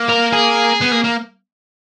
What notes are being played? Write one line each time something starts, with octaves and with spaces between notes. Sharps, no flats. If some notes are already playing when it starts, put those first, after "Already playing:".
Already playing: A#3
A#4
G#4
B3
A#3
A#3